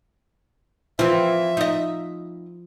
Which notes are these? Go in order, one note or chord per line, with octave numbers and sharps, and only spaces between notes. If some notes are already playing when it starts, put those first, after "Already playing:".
E3 F3 C4 C5 E5
D#4 D#5